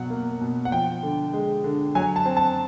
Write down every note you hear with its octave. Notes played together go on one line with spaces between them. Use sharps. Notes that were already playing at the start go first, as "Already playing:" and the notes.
Already playing: B2 F#3 F#5
A#3
B2
F#5
F3 G5
D3
G#3
D3
F#3 G#5
A5
C4
A5